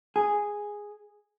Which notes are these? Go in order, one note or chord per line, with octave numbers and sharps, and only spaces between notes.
G#4